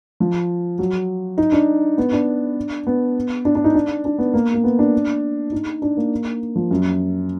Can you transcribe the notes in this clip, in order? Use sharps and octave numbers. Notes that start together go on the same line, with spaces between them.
F3
F#3
D#4
D4
B3
D4
B3
D4
D4
D#4
D4
D4
B3
A#3
A#3
B3
D4
D#4
D4
A#3
F3
F#2